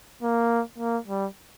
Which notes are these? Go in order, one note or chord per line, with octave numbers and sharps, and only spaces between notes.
A#3
A#3
G3